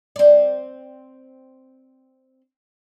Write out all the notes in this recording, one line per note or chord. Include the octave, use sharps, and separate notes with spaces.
C4 D5